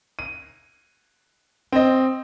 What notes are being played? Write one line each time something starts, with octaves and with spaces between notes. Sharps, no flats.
D#7
C4 D#5